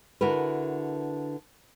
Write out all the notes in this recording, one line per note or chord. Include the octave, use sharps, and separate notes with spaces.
D3 E4 F#4 A#4 B4